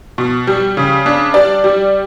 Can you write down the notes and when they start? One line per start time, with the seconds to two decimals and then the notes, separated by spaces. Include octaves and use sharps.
0.18 B2
0.47 G3
0.77 C#3
1.06 D4
1.34 G3 D5
1.64 G3